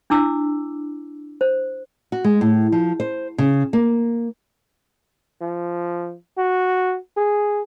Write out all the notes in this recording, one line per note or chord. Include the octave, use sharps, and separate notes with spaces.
D4 E4 D6 E6
C5
F#4
G#3
A2
F3
C5
C#3
A#3
F3
F#4
G#4